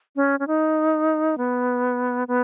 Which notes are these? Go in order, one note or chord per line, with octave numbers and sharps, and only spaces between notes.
C#4
C#4
D#4
B3
B3